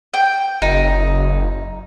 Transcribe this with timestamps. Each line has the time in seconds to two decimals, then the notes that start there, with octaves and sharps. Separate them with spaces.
0.14 G5
0.62 F#1 D#4